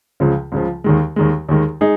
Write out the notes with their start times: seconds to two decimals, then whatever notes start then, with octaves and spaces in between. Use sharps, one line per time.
0.20 C#2 C#3 F3
0.52 C#2 C#3 F3
0.84 D#2 D#3 G#3
1.16 D#2 D#3 G#3
1.49 D#2 D#3 G#3
1.81 G#3 D#4 G#4